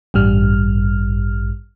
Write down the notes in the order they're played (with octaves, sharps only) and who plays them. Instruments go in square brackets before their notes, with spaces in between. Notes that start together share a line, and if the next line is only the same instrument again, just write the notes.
[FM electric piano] A1 G2 G3 F6